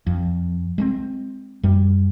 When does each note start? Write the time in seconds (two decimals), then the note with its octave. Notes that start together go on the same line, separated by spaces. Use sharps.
0.07 F2
0.78 G#3 A3 C4
1.63 F#2 G3